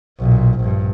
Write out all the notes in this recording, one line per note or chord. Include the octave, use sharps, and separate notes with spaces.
B1 A#2
A#1 G2